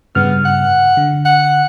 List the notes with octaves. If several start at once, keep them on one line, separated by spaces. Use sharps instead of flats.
G2 C#3 B3 F6
F#5
D3
F#5